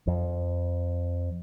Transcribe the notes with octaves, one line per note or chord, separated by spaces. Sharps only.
F2